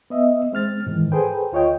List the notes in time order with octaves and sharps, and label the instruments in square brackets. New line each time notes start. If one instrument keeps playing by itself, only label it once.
[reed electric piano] B3 D#5 E5
G#3 C4 F6 A6
G#2 D#3 E3
G#4 A4 B4 C5 G5
D2 F4 C#5 D#5 G5